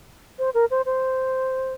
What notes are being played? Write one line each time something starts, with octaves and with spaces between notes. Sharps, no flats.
C5
A#4
C5
C5